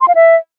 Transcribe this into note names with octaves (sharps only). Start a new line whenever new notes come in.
C6
F5
E5